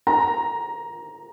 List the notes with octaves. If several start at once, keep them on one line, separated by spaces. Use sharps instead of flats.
A#5